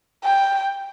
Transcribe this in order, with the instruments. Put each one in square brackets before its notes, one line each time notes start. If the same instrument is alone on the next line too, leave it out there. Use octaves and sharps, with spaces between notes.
[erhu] G5